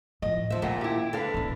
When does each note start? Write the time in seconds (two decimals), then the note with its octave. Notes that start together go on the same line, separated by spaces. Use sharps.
0.22 A1 F3 D#5
0.50 D#2 F3 E5
0.62 F2 A#2 D#3 A3 F#5
0.81 E4 G4
1.13 D3 A4 B4 F5
1.34 A1 D4